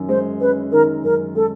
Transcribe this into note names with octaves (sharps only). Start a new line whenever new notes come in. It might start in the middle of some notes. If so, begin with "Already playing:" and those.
Already playing: F#2 D#3 C#4
G#3 C5
C#4 B4
D#3 A#4
F#2 A#4
G#3 A4